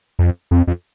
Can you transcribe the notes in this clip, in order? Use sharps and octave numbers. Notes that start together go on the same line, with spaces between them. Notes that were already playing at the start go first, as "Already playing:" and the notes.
F2
F2
F2